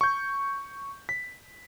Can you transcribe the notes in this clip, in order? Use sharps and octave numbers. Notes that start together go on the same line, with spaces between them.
C#6 G6
B6